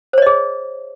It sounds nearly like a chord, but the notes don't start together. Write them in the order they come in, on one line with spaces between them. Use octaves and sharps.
C5 C#5 D#5 G#4